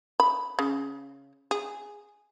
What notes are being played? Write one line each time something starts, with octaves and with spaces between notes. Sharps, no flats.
B5
C#3
G#4